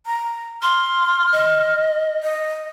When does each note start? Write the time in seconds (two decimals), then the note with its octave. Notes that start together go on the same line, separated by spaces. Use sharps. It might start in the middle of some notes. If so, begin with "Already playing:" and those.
0.07 A#5
0.62 C6 F6
1.32 D#5
2.23 D#5